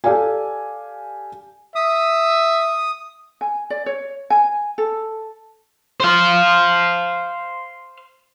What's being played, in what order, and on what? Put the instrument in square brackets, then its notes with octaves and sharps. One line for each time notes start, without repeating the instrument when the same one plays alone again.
[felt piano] G4 A4 D5 F5 G#5
[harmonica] E5 [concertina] D#6
[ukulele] G#5
D5
C#5
G#5
A4
[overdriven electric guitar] C5 F5